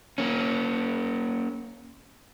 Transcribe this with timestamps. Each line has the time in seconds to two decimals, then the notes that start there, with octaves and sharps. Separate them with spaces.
0.18 A#3 C#4